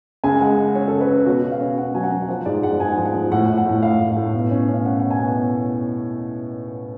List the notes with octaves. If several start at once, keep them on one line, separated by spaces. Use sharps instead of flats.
C#2 G#5
G#3 F#5
G#3
C#4 C#5
C#3 A4
B4
C#4 C#5
B2 F#4
B2
F5
C#4
C#4 F#5
F#3 G#5
F#5
F#3
F3 F#5
G#2 D5
G#2 F#5
G#2 G#5
F3
F#5
F3
A2 F#5
A2
F#5
A2
A2 F5
A2
F5
A2
B2
C#4
C#4
F5
C#4 F#5
B2 F#5
G#5
B2